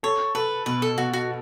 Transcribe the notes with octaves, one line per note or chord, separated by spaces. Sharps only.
A4 C#5
A4 B4
B2 B4
A4
B2 F#4
F#4